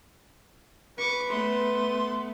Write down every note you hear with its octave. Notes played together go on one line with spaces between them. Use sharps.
B4 C#6 D6
A3 B3 C6